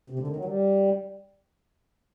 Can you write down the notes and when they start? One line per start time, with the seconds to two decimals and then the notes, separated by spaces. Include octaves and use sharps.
0.10 C3
0.19 D3
0.27 D#3
0.36 F#3
0.45 G3